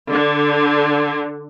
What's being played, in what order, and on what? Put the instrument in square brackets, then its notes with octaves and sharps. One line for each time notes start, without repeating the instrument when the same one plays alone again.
[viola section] D3